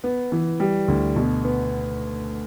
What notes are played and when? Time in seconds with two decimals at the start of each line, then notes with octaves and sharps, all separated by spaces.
0.04 B3
0.32 E3
0.60 G3
0.88 D2
1.16 B2
1.44 B3